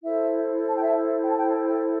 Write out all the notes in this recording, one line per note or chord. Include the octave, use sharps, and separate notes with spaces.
E4 A4 C5 E5
A5
G5
E5
G5
A5
G5
G5